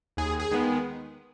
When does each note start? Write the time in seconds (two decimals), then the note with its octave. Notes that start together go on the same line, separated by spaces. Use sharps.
0.17 D#2 G#4
0.40 G#4
0.51 D#3 G#3 B3